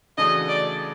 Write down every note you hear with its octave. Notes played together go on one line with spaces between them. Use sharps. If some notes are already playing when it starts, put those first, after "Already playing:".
C#3 E3 A3 D4 F#4 D#5
D5